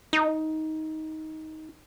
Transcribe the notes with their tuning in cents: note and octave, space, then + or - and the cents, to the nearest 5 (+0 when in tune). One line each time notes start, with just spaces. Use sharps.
D#4 +15